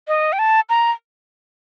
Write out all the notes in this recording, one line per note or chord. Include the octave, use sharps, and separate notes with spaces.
D#5
G5
A5
A#5